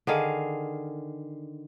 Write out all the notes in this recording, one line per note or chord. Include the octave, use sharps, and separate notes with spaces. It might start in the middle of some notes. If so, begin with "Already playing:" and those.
D3 D#3 G#4 F5